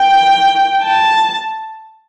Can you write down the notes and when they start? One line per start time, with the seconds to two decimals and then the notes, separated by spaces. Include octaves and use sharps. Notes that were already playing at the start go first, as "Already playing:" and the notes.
Already playing: G5
0.83 A5